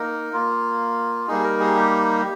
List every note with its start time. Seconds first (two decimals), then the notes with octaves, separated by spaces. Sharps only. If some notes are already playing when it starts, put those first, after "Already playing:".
Already playing: A#3 D#4 A#4
0.33 A#3 F4
1.28 G3 A#3 D#4 G#4
1.44 A#4
1.60 G#4
1.76 G4